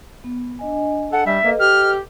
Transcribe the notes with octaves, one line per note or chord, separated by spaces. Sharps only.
B3
D4 D#5 G#5
A4 F#5
G3 E5
A#3 A4 B4 D#5
G4 F6